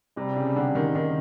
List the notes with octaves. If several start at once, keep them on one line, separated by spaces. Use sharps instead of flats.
C3 G3
C#3
D3
D#3
D#3